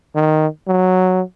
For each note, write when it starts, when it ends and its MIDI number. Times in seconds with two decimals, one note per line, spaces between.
0.15 0.47 51
0.68 1.22 54